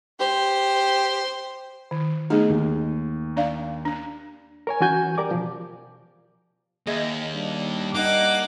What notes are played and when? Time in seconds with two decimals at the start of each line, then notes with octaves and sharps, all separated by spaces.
0.20 G4 C5
1.91 D#3
2.30 A3 B3 D#4 G#4
2.49 D#2
3.37 D4 D5 F5
3.85 D4
4.67 A#4 C#5 G#5
4.81 E3 C#4 F#4 G#5 G6
5.18 G4 A#4 D5 D6
5.31 B2 F3
6.87 D#2 G#4 D#5 E5
7.33 G3 D4
7.94 A#3 D#4 D#5 F#5 D6